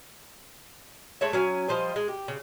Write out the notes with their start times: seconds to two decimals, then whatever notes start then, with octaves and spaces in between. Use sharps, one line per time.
1.21 G#3 A3 C#5 E5
1.33 F#3 C#4 G#5
1.68 F3 G3 C5 D#5
1.96 G#3
2.08 G4
2.28 C#3